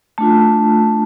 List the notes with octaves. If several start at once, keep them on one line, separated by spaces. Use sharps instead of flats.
A3 D4 F4 A5